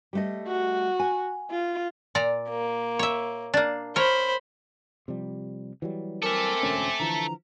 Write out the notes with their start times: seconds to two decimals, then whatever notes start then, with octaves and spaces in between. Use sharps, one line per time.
0.13 G3 A3 D#5
0.47 F#4
0.99 G#5
1.51 F4
2.15 A#2 D5 A#5
2.49 A#3
2.99 C#5 E5
3.54 A#3 D4
3.96 A#4 C5 C#5 B5
5.08 C3 F3 G3
5.82 E3 F#3 G3
6.23 C4 A4 A#4 E5 G#5 D6
6.63 E1 D2 C#4
7.00 D3 E3 F3 A#5